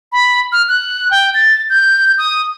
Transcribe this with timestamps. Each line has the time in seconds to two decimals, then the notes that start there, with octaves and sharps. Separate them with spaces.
0.12 B5
0.52 F6
0.68 F#6
1.11 G5
1.34 A6
1.70 G6
2.18 D#6